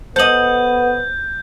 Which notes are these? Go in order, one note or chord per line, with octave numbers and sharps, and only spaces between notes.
B3 A4 C5 D#5 G6 F#7